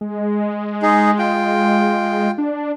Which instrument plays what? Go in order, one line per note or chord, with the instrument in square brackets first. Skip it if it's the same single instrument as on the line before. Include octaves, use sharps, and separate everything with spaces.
[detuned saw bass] G#3
[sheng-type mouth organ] D#4 G#4
F4 G5
[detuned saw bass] D4